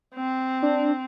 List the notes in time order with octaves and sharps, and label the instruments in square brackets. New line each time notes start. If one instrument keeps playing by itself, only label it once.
[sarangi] C4
[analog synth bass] D4